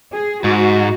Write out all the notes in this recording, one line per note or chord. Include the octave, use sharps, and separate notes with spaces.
G#4
G#2 F#4